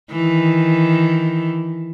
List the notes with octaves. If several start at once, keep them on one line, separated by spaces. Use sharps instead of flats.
D#3 E3